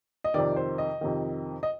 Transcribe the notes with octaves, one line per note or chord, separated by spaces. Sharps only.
D#5
F2 C3 D#3 D5
C5
D#5
F2 C3 D#3
D#5